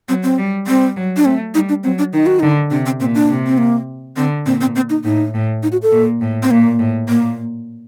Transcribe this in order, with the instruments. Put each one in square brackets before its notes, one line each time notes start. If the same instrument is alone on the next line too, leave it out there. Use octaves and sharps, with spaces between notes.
[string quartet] F#3 [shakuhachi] C4
[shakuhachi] C4
[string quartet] G3
[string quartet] G3 [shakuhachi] C4
[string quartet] F#3
[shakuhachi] D4
[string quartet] A3 [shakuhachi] C4
[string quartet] G3 [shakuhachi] D#4
[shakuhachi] D4
[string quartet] F#3 [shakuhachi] C4
[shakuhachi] D4
[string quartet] D#3 [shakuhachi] D#4
[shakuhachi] F#4
[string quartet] D3 [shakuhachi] D#4
[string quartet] C3 [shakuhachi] D4
[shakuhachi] C4
[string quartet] A#2 [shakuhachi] C4
[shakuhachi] D4
[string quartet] C3
[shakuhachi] C4
A#3
[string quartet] D3 [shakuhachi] C4
[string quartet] A#2 [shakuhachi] C4
[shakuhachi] C4
C4
D#4
[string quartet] A2 [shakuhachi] D#4
[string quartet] A2
[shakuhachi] D#4
F#4
A4
[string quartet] A#2
A2
[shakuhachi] C4
[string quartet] A#2 [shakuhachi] A#3
[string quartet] A2
[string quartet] A#2 [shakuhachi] A#3